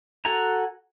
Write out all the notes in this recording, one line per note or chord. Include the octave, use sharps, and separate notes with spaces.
F#4 A4 F#5 G#5 A#5